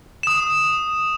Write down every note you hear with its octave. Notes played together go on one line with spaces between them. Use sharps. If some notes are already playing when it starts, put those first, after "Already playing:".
D#6 E7